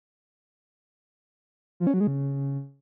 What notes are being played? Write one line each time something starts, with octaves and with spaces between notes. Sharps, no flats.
F3
C#4
F#3
G#3
C#3